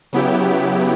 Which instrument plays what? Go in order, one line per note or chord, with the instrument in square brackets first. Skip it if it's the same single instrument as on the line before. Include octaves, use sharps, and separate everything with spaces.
[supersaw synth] C#3 F#3 B3 E4 G4